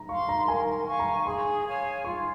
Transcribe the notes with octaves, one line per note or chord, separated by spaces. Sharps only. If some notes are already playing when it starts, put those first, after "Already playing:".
Already playing: A#5
F5 C6 C#6
A#5
A#4 G#5
F5 G#5 C#6
A#5
G#4 C6
C#5 F5 G#5
F4 C#6